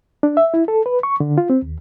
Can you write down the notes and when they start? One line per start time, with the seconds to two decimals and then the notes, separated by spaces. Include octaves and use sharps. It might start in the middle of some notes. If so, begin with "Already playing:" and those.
0.23 D4
0.37 E5
0.54 E4
0.68 A4
0.86 B4
1.03 C#6
1.20 D3
1.38 F4
1.50 C4
1.62 D#2